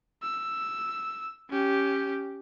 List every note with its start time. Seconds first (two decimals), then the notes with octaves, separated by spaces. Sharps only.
0.23 E6
1.50 C#4 G4